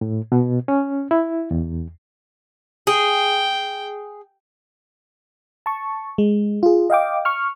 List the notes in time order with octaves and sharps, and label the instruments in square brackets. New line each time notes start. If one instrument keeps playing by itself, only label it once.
[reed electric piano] A2
B2
C#4
E4
E2
[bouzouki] G#4 [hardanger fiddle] G5
[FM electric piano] A5 C#6
G#3
F4 G#4
D#5 F5 G5 D6
C#6 F6